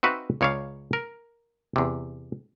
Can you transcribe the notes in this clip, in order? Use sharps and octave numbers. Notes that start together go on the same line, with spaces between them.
C4 D#4 F#4 B4 E5 F5
C#2 C#3 C#5 D5 F5
A#4
E2 C3